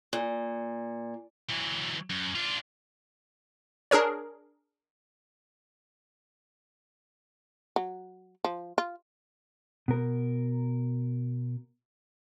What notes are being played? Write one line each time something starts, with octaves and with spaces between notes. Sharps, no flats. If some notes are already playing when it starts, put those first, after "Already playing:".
A#2
E3 F#3
F#2
D4 F4
D4 G#4 A#4 C#5
F#3
F3
F4
B2 A#4